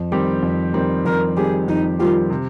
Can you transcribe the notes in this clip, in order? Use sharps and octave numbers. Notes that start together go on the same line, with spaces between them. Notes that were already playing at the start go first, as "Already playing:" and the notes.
Already playing: F2
D#3 G3 C4 G4
F2
D#3 G3 C4 G4
F2 A#4
D#3 G3 C4 G4 G#4
F2 D#4
D#3 G3 C4 F4 G4
C3